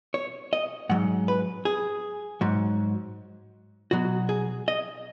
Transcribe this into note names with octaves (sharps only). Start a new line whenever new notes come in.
C#5
D#5
G#2 F#3 F#5
B4
G#4
G#2 F#3
B2 F#3 F#4
G#4
D#5